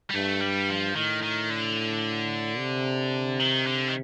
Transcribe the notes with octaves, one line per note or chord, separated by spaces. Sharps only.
G3
G2 A3
G3
F3
A2 D#3
D#3
D3
C3
D#3
D3
D#3